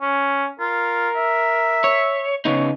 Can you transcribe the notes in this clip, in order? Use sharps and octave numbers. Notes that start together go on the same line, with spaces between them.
C#4
F4 A#4
E5
C#5
C#3 B3 D#4 C#5